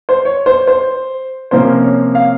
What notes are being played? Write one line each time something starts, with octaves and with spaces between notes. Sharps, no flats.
C5
C#5
C5
C5
C3 F3 A#3 C#4 C5
C#5
F5